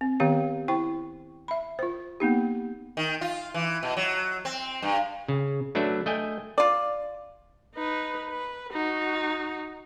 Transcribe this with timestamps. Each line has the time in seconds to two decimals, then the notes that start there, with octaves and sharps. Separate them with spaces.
0.01 C4
0.20 D#3 B3 G4 C#5 F5
0.68 E4 C5 G5 C#6
1.48 E5 B5
1.79 F4 C5
2.20 A#3 B3 D#4 G4
2.97 D#3
3.21 F4
3.54 E3
3.83 B2
3.97 F#3
4.45 C4
4.82 G2
5.28 C#3
5.75 F#3 A3 D4 B4 E5
6.06 A3 D#5 G5 G#5
6.58 F4 D5
7.75 D#4 B4
8.30 B4
8.73 D#4 F#4